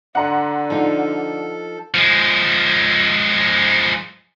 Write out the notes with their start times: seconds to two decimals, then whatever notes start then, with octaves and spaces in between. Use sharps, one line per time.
0.15 D3 F#5 A#5 C6
0.70 F3 D#4 F4 A4
1.94 F3 G#3